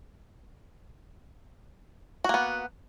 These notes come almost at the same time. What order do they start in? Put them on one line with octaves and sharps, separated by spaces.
F#4 A#3 B3